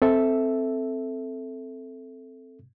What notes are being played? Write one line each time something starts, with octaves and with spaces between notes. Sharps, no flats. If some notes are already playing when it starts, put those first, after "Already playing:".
C4 A4 E5